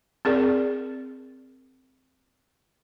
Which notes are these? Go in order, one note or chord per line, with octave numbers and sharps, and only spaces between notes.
C4 G#4 A#4 D5